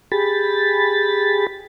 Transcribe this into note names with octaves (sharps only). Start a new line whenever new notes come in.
G4 G#4 B5 A6